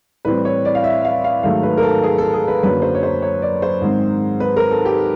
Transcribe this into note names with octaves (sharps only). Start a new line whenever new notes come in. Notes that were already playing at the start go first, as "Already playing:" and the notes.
A2 E3 G3 C4 B4
C#5
D5
F5
E5
F5
F5
G#2 D#3 F#3 A3 F5
B4
A#4
A4
G#4
A4
G#4
B4
F#2 D3 F#3 A#3 B4
C5
C#5
C5
C#5
D5
C5
G#2 D#3 G#3 C4
B4
A#4
A4
G4